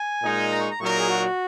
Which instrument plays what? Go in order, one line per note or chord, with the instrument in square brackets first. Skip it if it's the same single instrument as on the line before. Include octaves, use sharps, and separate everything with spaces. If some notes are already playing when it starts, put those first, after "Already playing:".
Already playing: [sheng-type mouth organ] G#5
[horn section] A#2 G#3 D#4 A#4
[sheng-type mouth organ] A#5
C#6
A#5
[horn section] A#2 F#3 D#4 A#4 [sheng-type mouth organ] C#6
[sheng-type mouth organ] A#5
G#4
F#4